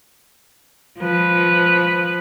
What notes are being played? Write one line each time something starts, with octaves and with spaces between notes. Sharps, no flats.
F3 B4